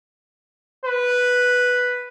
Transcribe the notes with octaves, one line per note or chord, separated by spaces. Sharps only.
B4